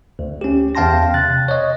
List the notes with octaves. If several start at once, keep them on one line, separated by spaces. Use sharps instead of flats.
D2
C#4 G4
E2 F5 G5 A5 C6 A#6
C3 F#6 A6
C#5 D#5